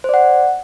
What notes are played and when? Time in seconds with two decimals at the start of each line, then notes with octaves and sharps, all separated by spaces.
0.04 C5
0.09 D5
0.14 F#5